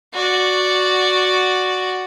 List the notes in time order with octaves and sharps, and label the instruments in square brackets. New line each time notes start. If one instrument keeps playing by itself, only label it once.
[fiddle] F#4 D5